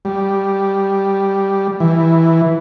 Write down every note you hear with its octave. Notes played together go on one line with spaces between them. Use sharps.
G3
E3